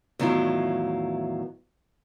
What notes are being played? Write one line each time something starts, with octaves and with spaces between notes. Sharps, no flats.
E2 A2 D#3 F#3 E4 F4